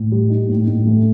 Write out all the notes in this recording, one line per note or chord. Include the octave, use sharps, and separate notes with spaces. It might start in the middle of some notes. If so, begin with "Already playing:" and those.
Already playing: A2
G3
D#4
A2
A2
A3